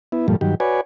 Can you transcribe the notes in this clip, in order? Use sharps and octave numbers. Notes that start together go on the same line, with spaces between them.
B3 E4
G2 A#2 F3 G3 A3
G2 D#3 F#3 G4
F#4 B4 C#5 D5 G#5